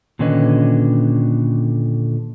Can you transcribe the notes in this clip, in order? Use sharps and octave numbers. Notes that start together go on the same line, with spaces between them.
A#2 D3 D#3 C#4 B4 D#5